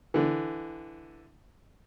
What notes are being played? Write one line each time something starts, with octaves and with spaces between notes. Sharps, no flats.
D3 E3